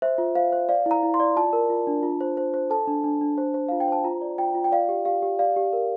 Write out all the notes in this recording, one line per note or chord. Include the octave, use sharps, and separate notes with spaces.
C5 E5
F4
C5 F5
C5
D5 F5
E4
A#5
E4
C6
D5
F4 A5
A#4
F4
D4
F4
C5
C5
C5
A4 A5
D4
D4
D4
C5
C5
F4 F5
G5
C5 A5
F4 A#5
D5
F4 G5
F4
G5
D5 F5
G4
G4 F5
G4
D5 F5
G4
A#4